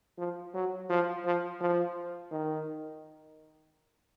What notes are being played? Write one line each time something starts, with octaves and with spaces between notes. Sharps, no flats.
F3
F#3
F3
F3
F3
D#3